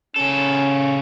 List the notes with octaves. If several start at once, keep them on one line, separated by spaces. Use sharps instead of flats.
C#3 C#4 A4